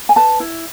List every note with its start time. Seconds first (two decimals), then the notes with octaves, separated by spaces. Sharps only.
0.09 G#5
0.16 B4 A5
0.40 E4